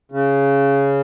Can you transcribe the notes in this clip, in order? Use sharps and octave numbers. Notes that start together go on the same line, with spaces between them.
C#3